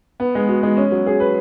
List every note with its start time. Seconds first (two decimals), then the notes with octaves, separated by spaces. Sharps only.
0.20 B3
0.35 G#3
0.49 F#4
0.63 G#3
0.77 C#4
0.92 F#3
1.06 G#4
1.20 B4